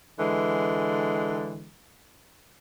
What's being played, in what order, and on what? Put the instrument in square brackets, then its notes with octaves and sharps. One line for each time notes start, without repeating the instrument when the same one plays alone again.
[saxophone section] D3 E3 G#3